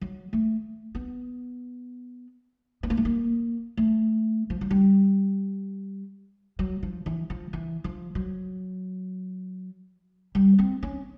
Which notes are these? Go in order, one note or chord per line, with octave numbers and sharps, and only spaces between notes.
F#3
A3
B3
B3
A#3
A3
A#3
A3
F3
F#3
G3
F#3
F3
E3
F3
E3
F3
F#3
G3
C4
C#4